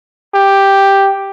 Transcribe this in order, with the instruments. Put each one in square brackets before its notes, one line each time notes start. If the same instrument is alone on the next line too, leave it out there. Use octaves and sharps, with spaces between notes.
[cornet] G4